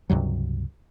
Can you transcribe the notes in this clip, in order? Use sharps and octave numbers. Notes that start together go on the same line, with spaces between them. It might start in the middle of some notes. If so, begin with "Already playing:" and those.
C#2 G2 C3 F#3